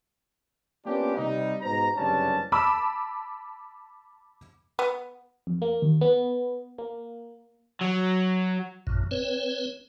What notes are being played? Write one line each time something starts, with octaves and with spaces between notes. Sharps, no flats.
A#3 B3 C#4 D4 F4 G4
C3 G3 D#4
G#2 B2 C5 A#5
F#1 G2 C3 C#4 D4 A5
A5 B5 D6 E6
B3
F2
A#3
D#2
B3
A#3
F#3
A1 F#2 A#2
C4 B4 C#5